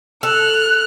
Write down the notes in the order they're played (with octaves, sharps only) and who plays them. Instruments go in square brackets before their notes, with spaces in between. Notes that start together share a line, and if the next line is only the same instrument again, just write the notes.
[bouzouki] A4 [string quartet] F6 F#6